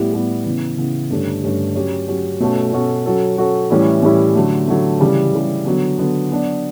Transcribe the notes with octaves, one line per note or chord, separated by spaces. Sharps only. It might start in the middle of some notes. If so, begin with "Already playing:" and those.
Already playing: A2 G3 B3 E4
A2 G3 B3 E4
C#3 E3 B3
C#3 E3 B3
G2 D3 A3 C#4 G4
G2 D3 A3 C#4 G4
F#3 C#4 G4
F#3 C#4 G4
B2 A3 C#4 F#4 A4
B2 A3 C#4 F#4 A4
F#3 C#4 F#4 A4
F#3 C#4 F#4 A4
A2 E3 G3 C#4 E4
A2 E3 G3 C#4 E4
D3 F#3 A3
D3 F#3 A3
C#3 E3 G3
C#3 E3 G3
D3 F#3 B3
D3 F#3 B3
F#3 B3 D4